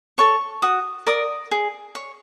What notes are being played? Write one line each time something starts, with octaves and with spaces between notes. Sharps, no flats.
A4 C#5 C#6
F#4 D#6
A#4 D5 D#6
G#4
C#5